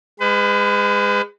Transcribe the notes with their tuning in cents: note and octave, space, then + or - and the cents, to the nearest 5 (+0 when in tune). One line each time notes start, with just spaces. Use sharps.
G#3 -20 B4 +35